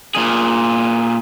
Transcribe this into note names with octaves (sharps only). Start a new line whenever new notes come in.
A#2 G#4